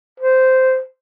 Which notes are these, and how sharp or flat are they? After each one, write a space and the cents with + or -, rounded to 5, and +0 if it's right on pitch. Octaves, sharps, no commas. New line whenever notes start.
C5 -10